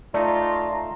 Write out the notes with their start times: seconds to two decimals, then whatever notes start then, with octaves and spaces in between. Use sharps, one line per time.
0.14 A3 D#4 F4 D5 A5 A#5 C6